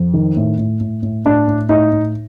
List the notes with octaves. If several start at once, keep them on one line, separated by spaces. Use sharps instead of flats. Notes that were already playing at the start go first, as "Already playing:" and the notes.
Already playing: F2
D#3
A2
A2
A2
A2
A2 D4
A2
A2 D#4
A2